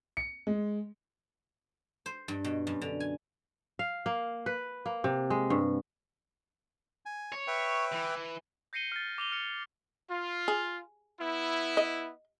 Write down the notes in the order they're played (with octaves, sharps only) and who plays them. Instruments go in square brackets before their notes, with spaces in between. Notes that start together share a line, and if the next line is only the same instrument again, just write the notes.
[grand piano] C#7
G#3
[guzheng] C5
G2
B2
F#2
D3
G#5
[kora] F5
A#3
B4
A#3
C3
G#3
G2
[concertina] G#5
[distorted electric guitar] C#5
[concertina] B4 E5 G5
[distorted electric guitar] E3
[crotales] G6 A#6 C7 C#7 D#7 G7
F6 A6
D6 F7 G7
F6 C#7 D#7
[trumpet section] F4
[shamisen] G#4
[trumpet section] B3 E4
[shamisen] D#5